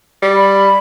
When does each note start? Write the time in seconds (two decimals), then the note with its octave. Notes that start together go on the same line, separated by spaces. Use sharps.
0.22 G3
0.34 B5